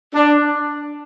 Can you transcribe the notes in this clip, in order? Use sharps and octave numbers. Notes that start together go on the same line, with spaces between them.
D4